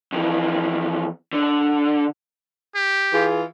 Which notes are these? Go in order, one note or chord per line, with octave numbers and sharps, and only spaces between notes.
F2 E3
D3
G4
E3 F4 G#4